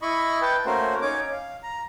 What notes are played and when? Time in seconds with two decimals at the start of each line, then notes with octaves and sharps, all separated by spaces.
0.02 E4 D#5 B5 C#6
0.42 B4 G5 A5
0.66 A3 A#3 C#4 F#4 A#4 C5
1.02 C#4 D#4 C#5 D6
1.32 F5
1.63 A#5